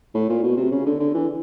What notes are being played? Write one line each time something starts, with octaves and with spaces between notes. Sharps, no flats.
A2
A#2
B2
C3
C#3
D3
D3
E3